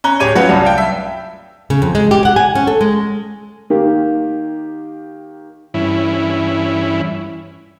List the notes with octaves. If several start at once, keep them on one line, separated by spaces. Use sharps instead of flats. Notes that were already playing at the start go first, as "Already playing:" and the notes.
C#4 A#5 F#6 G7
D1 G4 G#4 C#5 G#6 D#7
F#3 C#4 F4 B4 C#5 F#5
C2 F#2 G3 D4 A5
F5 G5 A5
E5
C#3
F2
G#3
G4
F#5
G#5
C#4
A4
G#3
D#3 A#3 G4
G2 E3 C#4 E4